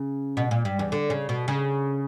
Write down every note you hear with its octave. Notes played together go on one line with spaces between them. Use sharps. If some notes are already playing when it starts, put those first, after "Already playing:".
Already playing: C#3
B2
A#2
G2
E2
D3
C#3
B2
C#3